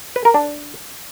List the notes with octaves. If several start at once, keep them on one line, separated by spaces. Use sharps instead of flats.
B4
A#4
D4